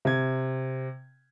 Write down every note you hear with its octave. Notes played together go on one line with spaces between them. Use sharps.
C3 G#6